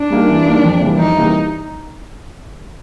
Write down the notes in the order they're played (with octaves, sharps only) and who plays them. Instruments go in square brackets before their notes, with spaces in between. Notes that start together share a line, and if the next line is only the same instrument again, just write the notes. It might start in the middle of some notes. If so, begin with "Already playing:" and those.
Already playing: [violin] D4
[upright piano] G3 A#3 D#4
E3
G3 A#3 D#4
F2
C3 E3 G3 A#3
[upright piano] F2 [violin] D#4
[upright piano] C3 E3 G3 A#3